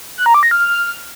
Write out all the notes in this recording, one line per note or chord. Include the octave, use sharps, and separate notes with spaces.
F#6
A#5
D6
A#6
F6